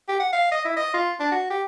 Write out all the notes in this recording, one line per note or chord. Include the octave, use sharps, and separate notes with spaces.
G4
F#5
F5
D#5
E4
D#5
F4
D4
F#4
G4